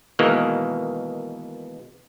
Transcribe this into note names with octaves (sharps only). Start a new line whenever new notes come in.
B2 D#3 E3 G#3 A#3